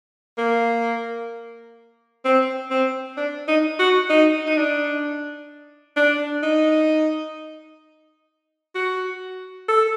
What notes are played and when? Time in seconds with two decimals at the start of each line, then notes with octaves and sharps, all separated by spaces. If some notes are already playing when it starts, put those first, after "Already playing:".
0.38 A#3
2.25 C4
2.70 C4
3.17 D4
3.48 D#4
3.79 F#4
4.10 D#4
4.46 D#4
4.57 D4
5.96 D4
6.43 D#4
8.75 F#4
9.68 A4